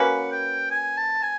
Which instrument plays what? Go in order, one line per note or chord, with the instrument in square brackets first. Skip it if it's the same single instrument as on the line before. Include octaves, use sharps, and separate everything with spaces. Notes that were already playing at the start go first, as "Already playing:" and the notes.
Already playing: [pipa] A#3 C#4 F#4 B4 [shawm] F#5
[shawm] G5
G#5
A5
G#5